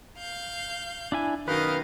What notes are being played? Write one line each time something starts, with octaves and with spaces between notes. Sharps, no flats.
F5 G6
D4 E4 G#5
F#2 B2 D#3 B4 D#5 F5